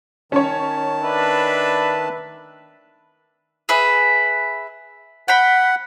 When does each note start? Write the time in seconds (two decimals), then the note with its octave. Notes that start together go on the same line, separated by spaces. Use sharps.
0.32 D#3 C#4 C#5 A5
1.03 D4 B4 E5 B5
3.69 G#4 B4 E5
5.28 F#5 G5 B5